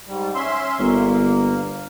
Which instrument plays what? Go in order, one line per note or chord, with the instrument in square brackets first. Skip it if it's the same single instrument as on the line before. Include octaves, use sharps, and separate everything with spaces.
[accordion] G#2 G3
C#4 E5 C6
[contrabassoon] G1 [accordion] A#3